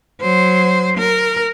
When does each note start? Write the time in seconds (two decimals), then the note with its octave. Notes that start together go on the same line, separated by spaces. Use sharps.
0.21 F#3 C5
0.97 A#4